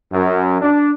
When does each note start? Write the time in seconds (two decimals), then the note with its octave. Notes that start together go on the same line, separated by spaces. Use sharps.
0.13 F#2
0.61 D4